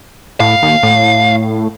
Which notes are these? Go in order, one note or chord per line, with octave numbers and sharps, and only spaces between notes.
A2 F5
D#2
A2